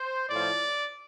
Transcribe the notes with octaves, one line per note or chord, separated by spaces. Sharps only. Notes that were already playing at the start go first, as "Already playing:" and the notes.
Already playing: C5
A2 F3 D5